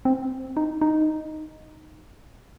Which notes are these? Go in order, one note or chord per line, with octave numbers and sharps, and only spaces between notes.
C4
D#4
D#4